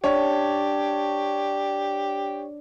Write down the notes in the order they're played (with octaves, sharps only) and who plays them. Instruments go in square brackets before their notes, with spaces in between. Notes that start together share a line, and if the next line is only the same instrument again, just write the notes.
[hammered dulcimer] D4 [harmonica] G4 [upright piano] C#5